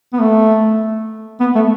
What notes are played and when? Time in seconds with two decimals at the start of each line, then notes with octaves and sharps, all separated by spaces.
0.13 B3
0.20 A3
1.40 B3
1.55 A3